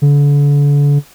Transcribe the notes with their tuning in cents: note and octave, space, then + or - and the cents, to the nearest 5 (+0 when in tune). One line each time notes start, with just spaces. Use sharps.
D3 -35